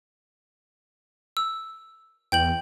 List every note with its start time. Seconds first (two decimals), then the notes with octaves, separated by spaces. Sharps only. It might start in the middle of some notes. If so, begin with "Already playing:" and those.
1.37 E6
2.32 E2 G5 G6 F#7